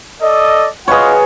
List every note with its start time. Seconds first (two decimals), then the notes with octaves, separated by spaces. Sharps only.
0.21 A4 D5 D#5
0.88 F4 G#4 B4 C#5 D#5 F#5